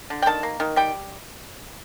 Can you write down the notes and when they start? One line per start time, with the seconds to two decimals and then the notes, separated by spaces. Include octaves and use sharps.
0.10 D3
0.22 G5
0.26 D#3 A5
0.43 A#3
0.60 D#3
0.76 G3 G5